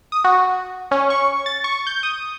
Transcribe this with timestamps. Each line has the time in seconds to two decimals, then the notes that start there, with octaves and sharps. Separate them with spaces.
0.12 D#6
0.24 F#4
0.91 C#4
1.10 C#6
1.46 A6
1.64 C#6
1.87 G6
2.03 D#6